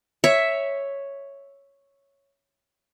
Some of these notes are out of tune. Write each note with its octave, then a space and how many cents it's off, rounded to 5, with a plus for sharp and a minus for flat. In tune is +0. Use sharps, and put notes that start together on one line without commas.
C#5 +0 E5 +0